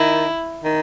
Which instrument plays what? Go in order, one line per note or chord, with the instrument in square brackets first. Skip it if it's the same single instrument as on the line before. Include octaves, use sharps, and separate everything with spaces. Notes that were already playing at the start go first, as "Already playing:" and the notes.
Already playing: [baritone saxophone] D#3 [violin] E4
[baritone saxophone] D#3